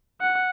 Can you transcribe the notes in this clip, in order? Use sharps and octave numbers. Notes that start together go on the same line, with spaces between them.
F#5